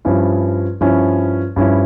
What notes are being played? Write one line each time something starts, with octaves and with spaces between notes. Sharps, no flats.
G2 F3 C#4 E4
G2 F3 C#4 E4
G2 F3 C#4 E4